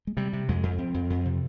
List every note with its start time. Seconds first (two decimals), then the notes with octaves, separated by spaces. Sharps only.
0.07 G#3
0.17 C3 G3
0.33 C3
0.49 F2 G#3
0.63 F2
0.78 F2 C4
0.94 F2
1.10 F2
1.25 C3